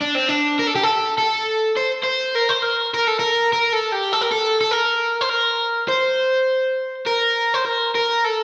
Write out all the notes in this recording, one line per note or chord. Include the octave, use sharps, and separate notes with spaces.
D4
C4
D4
A#4
A4
G4
A4
A4
C5
C5
A#4
C5
A#4
A#4
A4
A#4
A#4
A4
G4
A4
A#4
A4
A4
A#4
C5
A#4
C5
A#4
C5
A#4
A#4
A4